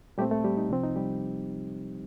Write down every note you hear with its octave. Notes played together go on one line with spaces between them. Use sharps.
A#2 G3 A3 C4 G4
A3 A4
G3 G4
D#4
C2 C3 F3 C4 D4
D#4
G3 G4